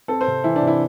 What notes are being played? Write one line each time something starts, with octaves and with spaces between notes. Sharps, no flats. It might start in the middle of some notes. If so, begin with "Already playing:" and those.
C4 A4
C5
C3
E3 E4
D4
C3
E4